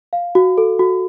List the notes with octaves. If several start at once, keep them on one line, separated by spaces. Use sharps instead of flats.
F5
F#4
A4
F#4